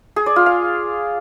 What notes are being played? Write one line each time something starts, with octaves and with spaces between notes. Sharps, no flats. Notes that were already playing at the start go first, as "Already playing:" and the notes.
G#4
D5
F4
F5